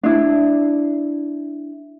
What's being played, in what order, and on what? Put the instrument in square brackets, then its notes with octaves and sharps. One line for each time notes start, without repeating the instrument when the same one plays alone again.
[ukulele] D4 E4